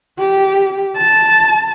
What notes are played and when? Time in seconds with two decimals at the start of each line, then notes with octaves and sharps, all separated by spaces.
0.19 G4
0.97 A5